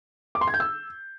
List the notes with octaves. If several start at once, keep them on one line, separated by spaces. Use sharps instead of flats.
D6
C6
G#6
G6
E6